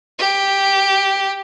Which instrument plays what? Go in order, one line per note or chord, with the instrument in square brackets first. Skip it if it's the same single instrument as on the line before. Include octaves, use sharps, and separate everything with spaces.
[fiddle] G4